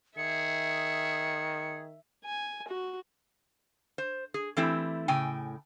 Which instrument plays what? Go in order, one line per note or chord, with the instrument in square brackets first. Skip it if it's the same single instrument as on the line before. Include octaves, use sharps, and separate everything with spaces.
[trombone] D#3 [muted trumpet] G#4 [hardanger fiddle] E5 [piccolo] C#7
[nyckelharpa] G#5
F#4
[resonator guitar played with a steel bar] C5
G#4
E3 A3 C4 E4 G4
A2 C#3 G5 G#5